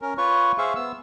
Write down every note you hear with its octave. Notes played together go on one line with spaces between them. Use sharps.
C#4 A#4
F4 B4 C#5 C#6
G#4 C5 E5 F5 C#6
B3 E6